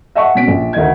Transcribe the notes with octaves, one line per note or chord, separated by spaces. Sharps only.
D#5 E5 F#5 A5 C#6
B2 C#4 B6 D7
A#1
D2 D#3 D#5 G#6